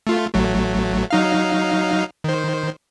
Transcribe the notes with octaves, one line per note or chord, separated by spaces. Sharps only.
A3 F4
A1 F#3 A3
F#3 D#4 F5
D#3 C5